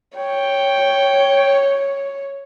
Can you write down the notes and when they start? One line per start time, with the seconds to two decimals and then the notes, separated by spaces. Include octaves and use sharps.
0.16 C#5 G5